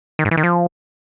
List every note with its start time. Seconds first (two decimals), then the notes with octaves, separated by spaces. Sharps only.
0.19 D#3
0.25 G#2
0.31 E3
0.37 D#3
0.43 F3